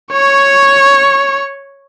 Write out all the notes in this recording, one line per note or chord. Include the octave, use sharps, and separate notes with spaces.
C#5 C#6